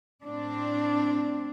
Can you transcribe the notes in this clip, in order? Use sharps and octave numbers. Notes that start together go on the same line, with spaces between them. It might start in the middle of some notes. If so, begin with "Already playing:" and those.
A2 C4 D4